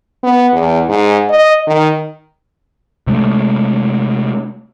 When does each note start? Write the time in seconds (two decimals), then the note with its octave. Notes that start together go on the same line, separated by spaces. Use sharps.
0.23 B3
0.53 E2
0.89 G#2
1.29 D#5
1.67 D#3
3.07 C3 G#3 A3